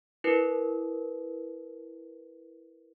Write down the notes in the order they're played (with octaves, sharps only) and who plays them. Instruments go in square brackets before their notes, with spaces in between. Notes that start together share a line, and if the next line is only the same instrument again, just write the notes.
[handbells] E4 A#4 B4